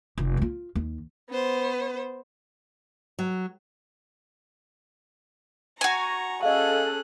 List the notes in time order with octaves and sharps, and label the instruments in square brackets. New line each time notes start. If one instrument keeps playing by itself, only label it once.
[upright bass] F1
E4 F4
D#2
[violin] B3 C5
[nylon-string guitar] F#3
[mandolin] F#4 G#5 [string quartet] A#5 C#6
[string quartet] C#4 G#4 F#6 [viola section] A4 [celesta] D#5 F5